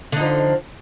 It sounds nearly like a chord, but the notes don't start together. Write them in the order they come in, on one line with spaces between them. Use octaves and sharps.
D3 D#4 F3